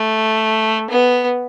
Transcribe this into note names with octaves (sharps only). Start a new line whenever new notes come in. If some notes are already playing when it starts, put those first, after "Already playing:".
Already playing: A3
B3